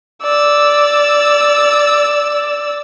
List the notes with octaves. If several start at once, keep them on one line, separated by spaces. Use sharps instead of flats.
D5 E6